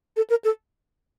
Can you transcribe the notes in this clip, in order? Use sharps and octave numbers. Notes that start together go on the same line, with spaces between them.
A4
A#4
A4